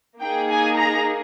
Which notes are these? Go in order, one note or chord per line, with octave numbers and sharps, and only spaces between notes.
A#3 D#4 G#4 G5
G#5
A#5